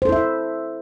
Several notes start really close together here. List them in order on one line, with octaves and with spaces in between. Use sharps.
C5 A4 E4 E5